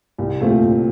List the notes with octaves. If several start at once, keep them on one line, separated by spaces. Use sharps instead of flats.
C2
A#2 F3 A3 C4
C2